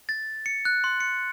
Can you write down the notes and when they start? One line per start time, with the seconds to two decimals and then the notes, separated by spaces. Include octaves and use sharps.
0.09 A6
0.46 C#7
0.65 F#6
0.84 C6
1.00 C#7